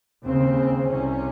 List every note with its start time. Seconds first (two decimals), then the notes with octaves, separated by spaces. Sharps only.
0.22 D#2 C#3 C4
0.87 C2 C3 C#4